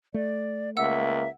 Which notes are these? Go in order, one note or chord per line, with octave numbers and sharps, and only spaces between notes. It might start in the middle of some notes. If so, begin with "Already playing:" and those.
A3 D5
C#2 A#3 E5 F#5 E6